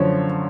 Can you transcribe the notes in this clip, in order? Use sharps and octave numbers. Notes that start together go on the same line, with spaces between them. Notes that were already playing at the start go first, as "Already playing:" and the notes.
Already playing: F#2 D3 F3 C5 C#5